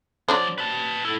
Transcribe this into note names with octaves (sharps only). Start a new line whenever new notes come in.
F3 F#3 D4 C5 D5
B4 A5
E4 A4